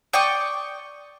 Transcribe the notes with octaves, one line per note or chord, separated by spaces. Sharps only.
D5 G5 C#6 D#6